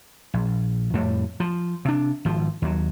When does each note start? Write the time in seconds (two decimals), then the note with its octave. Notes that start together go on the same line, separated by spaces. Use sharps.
0.34 A#1
0.94 F2 A2 G3
1.40 F3
1.85 C3 D4
2.25 G#1 F3
2.62 D#2 F#3